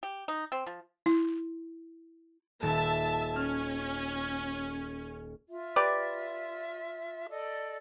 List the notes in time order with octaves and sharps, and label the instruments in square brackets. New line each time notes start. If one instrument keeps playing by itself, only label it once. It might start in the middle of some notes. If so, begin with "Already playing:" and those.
[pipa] G4
D#4
C4
F3
[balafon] E4
[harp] D#1 A6 [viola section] E5 A5
[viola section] C#4 [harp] F6
[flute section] F4 E5
[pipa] G4 B4 D5
[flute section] A4 D5 D#5